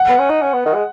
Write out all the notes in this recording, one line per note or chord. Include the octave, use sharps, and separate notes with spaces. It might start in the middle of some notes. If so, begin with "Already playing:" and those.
Already playing: F#5
B3
C#4
D#4
C#4
B3
D#3
G#3